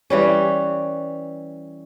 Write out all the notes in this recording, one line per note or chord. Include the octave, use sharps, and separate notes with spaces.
E3 G3 C#4